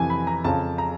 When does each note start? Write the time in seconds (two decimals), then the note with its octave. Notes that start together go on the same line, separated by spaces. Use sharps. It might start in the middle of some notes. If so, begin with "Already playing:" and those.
Already playing: F2 C3 E3 G#5
0.10 B5
0.27 A#5
0.44 F2 C#3 F3 A5
0.78 A#5